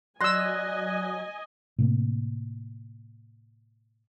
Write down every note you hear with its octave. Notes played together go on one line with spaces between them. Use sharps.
F#3 D5 D#5 G#5 C6 E6 F#6 A#6
A2 C3 A#3